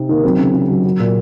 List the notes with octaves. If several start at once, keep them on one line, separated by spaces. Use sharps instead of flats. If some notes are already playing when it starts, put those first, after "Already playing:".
Already playing: C3 C4 D#4
D#3 A#3
F#3 C4
C#3
C#3
F#3
F#3
A#2